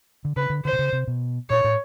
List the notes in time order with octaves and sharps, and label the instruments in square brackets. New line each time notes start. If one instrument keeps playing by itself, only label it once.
[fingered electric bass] D3
[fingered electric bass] C#3 [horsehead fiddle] B4
[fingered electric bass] D3
[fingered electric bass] D3 [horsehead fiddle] C5
[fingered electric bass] C3
C#3
C3
B2
[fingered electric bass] A#2 [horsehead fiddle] C#5
[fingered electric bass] A2